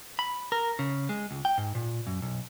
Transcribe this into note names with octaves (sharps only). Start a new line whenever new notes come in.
B5
A#4
C#3
G#3
C#2
G5
G#2
A#2
F#2
B1